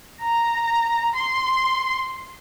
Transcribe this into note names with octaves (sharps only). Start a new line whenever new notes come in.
A#5
C6